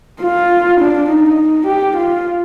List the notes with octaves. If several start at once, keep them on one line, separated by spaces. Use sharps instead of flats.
F4
D4
D#4
G4
F4